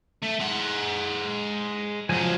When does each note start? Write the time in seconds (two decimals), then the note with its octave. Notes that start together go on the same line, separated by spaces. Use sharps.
0.23 A3
0.40 G#3 F#5
2.09 C#2 F3 F#3 G#5